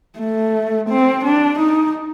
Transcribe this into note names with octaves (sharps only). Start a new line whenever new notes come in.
A3
C4
D4
D#4